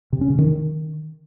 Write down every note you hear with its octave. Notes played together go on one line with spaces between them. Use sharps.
C3
C#4
C#3
D#3